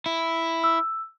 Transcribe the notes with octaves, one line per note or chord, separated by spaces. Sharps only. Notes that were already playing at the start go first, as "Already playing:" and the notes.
E4
E6